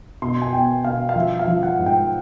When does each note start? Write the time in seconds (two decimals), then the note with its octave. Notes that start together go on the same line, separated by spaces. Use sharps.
0.22 B2 C6
0.42 G#5
0.53 B3 G5
0.84 B2 F5
1.09 F5
1.16 F3 E5
1.39 F5
1.47 F3
1.63 F#5
1.79 G#2
1.86 G5